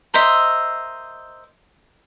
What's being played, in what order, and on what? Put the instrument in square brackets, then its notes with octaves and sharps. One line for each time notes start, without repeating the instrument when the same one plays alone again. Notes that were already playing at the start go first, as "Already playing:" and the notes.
[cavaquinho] A#4 C5 D#5 E5